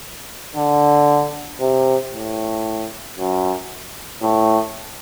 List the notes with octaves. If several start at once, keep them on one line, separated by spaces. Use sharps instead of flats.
D3
C3
A2
F#2
A2